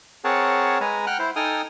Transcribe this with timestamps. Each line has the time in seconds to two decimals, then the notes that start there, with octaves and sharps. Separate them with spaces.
0.24 C4 G#4 A#4 C#5 F#5 A5
0.81 G#3 B4 G#5 A#5
1.07 F#5 G5 F6 F#6
1.19 E4 C5
1.36 D#4 A4 G5 G#5 D#6 F6